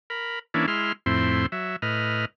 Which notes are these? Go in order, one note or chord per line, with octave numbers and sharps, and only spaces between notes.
A#4 B5
E3 A#3 C#4 D4 E4
G#3 E4 C6 F6
F2 A2 C4 E4 C6
F#3 E5
A2 B4 D#5 F6